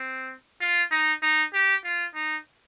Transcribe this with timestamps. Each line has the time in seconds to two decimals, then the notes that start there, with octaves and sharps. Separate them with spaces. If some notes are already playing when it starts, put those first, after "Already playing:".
Already playing: C4
0.61 F4
0.91 D#4
1.22 D#4
1.53 G4
1.84 F4
2.15 D#4